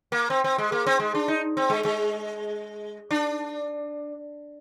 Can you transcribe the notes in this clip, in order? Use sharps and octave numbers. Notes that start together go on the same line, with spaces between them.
A#3
C4
C4
G#3
A#3
C4
G#3
D4
D#4
C4
G#3
G#3
D4